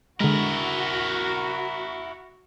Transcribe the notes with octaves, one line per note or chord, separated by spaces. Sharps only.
D3 G#3 E4 F#4 A#4